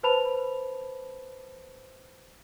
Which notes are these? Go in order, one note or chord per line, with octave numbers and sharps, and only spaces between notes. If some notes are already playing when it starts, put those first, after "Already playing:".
B4 C5 A5 B5 F7